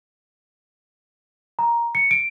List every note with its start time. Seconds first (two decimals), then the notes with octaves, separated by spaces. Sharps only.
1.59 A#5
1.95 C#7
2.11 D7